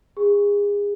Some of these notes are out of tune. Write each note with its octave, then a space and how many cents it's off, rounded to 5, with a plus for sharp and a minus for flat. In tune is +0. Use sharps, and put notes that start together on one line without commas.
G#4 -30